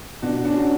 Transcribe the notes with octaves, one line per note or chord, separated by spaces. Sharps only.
B2 D4 F#4
C#4 D4 F#4